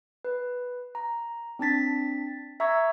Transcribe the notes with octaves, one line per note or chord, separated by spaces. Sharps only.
B4
A#5
C4 D4 A5 A6 B6
E5 A#5 C#6 E6 G#6